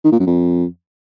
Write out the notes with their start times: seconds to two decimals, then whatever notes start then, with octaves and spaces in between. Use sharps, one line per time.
0.04 D#3
0.12 A#2
0.19 F#2
0.27 F2